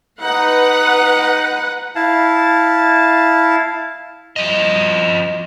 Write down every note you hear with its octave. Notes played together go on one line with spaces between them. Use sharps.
D#4 B4 F#5
E4 F5 A5
F3 D#5